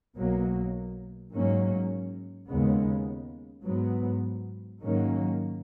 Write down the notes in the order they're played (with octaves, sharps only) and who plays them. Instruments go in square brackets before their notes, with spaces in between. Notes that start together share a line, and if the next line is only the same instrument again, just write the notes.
[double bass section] B1 B2 F#3 A#3
G#2 F#3 A#3 C#4
D#2 C#3 G#3 B3
G#2 F#3 B3
G#2 D#3 F#3 A#3 C#4